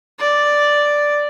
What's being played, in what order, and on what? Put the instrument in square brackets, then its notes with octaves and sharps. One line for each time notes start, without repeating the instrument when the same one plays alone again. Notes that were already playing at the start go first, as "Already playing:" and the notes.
[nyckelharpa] D5